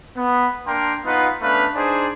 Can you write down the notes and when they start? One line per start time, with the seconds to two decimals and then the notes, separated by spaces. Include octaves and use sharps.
0.17 B3
0.67 A#3 D4 A#4 G5 C6
1.05 B3 D#4 F4 B4 F#5
1.42 A3 B3 C#4 D4 B4 F5
1.76 D4 D#4 G#4 C5 G#5